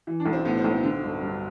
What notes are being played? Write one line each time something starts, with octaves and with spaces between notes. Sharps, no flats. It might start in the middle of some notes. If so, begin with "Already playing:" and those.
E3
D4
B1
C4
A2 B3
C4
B1
C4
D3
G1
G2